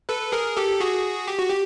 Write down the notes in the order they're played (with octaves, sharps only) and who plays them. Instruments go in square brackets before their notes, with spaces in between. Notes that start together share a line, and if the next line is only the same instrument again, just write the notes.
[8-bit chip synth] A4 B4
G#4 A#4
G4 A4
F#4 G#4
G4
F#4
G4